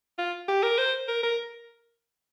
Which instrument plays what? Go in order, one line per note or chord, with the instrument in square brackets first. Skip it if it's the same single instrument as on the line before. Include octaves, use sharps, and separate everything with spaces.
[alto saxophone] F4
G4
A#4
C5
A#4
A#4